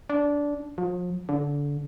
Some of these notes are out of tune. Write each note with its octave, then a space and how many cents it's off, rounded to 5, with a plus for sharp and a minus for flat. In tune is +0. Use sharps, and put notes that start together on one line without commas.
D4 -15
F3 +40
D3 -25